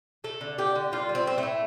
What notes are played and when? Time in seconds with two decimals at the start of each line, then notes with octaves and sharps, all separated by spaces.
0.24 A3 A4
0.41 D3
0.58 D3 G4
0.75 D3
0.92 G3 F4
1.09 G3
1.15 C4
1.26 A2 C4
1.38 A3
1.43 A2